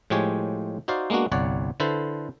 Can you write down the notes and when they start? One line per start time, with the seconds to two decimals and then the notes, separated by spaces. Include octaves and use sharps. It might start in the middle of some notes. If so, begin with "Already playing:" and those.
0.10 A2 F3 G#3 G4 C#5 G#5
0.88 D#4 F#4 C5 D5 F5
1.10 G#3 A#3 B3 D4 F#4
1.32 G1 C2 C#5 D5 F#5
1.80 D3 E4 A4 B4 C5